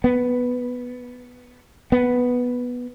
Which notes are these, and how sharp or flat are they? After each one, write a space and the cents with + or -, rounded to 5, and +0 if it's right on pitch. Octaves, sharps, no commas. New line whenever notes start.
B3 +0
B3 -5